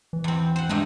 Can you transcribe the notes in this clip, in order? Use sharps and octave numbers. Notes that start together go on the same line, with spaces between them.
E3
E2 C4
C5 F#5
G2 G#3 A3 D#4